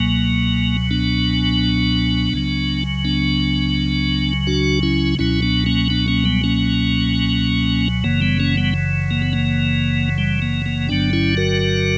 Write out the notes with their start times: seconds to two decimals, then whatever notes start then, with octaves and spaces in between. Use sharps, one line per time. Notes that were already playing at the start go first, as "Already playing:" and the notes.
Already playing: C#2 B2 F#3 A#3
0.91 B3 D4
2.33 C#2 C#3 F#3
3.05 B3 D4
4.47 D4 F#4
4.83 C#4 E4
5.19 C#2 B2 F#3 C#4 E4
5.42 B3 D4
5.66 A#3 C#4
5.90 B3 D4
6.08 A#3 C#4
6.25 G3 B3
6.44 A#3 C#4
8.04 F#1 F#2 C#3 E3 A#3
8.21 G3 B3
8.40 A#3 C#4
8.57 G3 B3
9.11 A#3
9.22 B3
9.33 A#3
10.18 G3
10.42 A#3
10.66 A#3
10.89 G1 G2 D3 F#3 B3 D4
11.13 C#4 E4
11.37 F#4 A#4